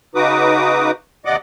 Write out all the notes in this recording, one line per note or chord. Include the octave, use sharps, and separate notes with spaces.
C#3 D#4 F#4 B4 D6 D#6
D#2 C3 D5 D#5 F#5 D6